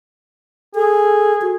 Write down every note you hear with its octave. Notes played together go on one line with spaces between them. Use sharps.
G#4 A4
F#4